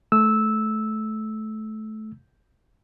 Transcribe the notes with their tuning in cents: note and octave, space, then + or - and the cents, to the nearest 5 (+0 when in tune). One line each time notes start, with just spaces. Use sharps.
A3 -20 E6 -10